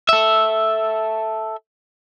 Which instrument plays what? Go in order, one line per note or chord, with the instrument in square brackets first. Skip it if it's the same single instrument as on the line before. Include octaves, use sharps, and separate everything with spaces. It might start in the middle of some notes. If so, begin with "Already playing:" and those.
[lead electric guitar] A4 E5